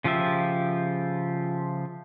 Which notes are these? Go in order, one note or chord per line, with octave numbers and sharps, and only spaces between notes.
C#3 F3 F4 G4 E5